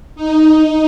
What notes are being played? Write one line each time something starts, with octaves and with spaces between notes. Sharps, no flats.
D#4